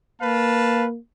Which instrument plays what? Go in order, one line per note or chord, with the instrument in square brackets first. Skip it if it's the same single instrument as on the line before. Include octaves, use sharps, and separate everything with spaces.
[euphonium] A#3 [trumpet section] B4 F5 A5